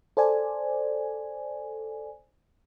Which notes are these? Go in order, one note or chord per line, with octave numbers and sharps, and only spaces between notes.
A4 C5 D5 G#5